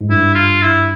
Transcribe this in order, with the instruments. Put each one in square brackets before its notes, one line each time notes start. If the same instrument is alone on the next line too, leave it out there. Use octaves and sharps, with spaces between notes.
[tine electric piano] G#2
[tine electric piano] G2 [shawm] E4
[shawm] F4
E4